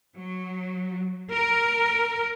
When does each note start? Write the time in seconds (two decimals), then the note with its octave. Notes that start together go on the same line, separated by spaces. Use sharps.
0.16 F#3
1.32 A#4